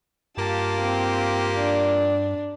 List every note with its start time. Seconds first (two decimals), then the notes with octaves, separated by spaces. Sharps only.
0.37 G2 A#3 F4 G4 A5
0.82 C4
1.56 D4